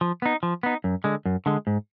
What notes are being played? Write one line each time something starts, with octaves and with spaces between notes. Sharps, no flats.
F3
B3 D#4
F3
B3 D#4
F#2
D3 G#3
F#2
D3 G#3
G#2